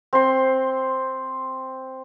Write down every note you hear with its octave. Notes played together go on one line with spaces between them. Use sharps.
C4 C6